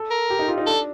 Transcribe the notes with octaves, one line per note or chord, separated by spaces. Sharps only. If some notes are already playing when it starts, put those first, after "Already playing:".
Already playing: A4
A#4
G4
D#4
F4
D#4
D4 A4